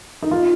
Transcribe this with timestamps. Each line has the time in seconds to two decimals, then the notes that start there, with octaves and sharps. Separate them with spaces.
0.23 D#4
0.31 F4